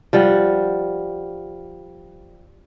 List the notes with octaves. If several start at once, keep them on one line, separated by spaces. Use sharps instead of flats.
F3 G3 F#5